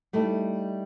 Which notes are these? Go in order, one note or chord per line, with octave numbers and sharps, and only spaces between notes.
G3 A3 D#4 E4